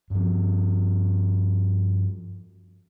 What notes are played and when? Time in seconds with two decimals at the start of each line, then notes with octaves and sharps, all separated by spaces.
0.10 G2 F3